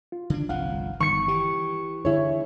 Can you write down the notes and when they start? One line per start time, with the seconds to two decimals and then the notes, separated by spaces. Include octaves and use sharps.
0.12 F4
0.30 D3 D4
0.49 G1 C2 F3 F5 F#5
1.00 G1 D#3 C#6 C#7
1.28 E3 G4
2.05 D3 E4 G#4 C#5